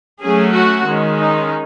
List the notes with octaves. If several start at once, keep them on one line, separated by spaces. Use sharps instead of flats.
F#3 A3 C#4 G#4
F#4
D#3 G#3 C#4
D#4